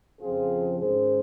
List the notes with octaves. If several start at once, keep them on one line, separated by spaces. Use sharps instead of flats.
F2 C#3 F3 C4 F4 G#4
G#2 D#3 G#3 C#4 G#4 C5